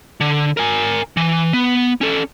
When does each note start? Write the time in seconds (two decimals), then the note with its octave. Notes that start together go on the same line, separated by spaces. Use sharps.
0.21 D3
0.57 A#4 G#5
1.17 E3
1.53 B3
2.01 C#4 A4